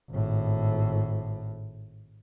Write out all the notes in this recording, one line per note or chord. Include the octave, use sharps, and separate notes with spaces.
G#1 A2